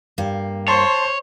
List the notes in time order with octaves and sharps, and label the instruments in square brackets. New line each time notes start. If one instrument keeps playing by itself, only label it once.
[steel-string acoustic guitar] G2 A#3
[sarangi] C5 [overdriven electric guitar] C#5 [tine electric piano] A5 C6 C#6